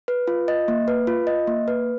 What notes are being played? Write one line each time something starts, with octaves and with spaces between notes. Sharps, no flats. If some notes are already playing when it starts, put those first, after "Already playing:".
B4
F4
D#5
A#3
B4
F4
D#5
A#3
B4